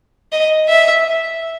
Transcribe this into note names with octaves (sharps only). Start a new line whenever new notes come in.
D#5
E5